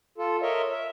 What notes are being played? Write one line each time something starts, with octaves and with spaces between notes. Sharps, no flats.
F4 A4
A#4 C#5 D#5 E5
E5